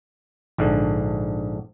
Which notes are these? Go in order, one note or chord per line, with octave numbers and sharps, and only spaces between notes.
A#1 G#2 D3